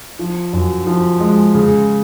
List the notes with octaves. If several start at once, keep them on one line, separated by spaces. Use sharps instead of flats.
F3
F#2
F3
G#3
C#3